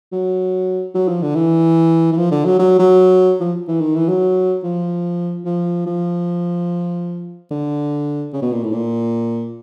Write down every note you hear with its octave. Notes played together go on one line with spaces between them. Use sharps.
F#3
F#3
F3
D3
E3
E3
F3
D3
F#3
F#3
F#3
F3
E3
D#3
E3
F#3
F3
F3
F3
D3
C#3
B2
A#2
A2
A#2